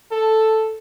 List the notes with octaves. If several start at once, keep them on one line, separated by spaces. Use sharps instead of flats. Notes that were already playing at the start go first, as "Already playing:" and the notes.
A4